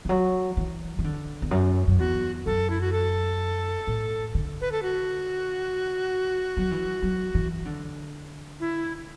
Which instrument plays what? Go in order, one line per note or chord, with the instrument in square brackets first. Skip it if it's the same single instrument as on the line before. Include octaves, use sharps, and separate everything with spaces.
[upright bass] E3
F#3
E3
E3
D3
E2
F#2
F#2
[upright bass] E2 [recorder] F#4
[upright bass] F#2 [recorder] A4
[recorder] E4
F#4
A4
[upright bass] A2
D3
[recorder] B4
A4
F#4
[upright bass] F#3
E3
F#3
E3
D3
[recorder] E4